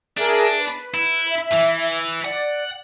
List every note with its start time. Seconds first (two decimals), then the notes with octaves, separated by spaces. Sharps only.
0.17 D4 G#4 A#4 E5
0.58 B4
0.94 E4
1.29 E5
1.53 E3
2.25 D5 F#5